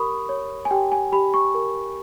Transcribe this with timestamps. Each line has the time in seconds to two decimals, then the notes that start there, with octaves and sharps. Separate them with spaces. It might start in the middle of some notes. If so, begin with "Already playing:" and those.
Already playing: G4 A#4 B5 C#6 D#6
0.29 C#5
0.65 G#5
0.71 G4 G5
0.92 G#5
1.12 G4 B5
1.34 C#6
1.55 A#4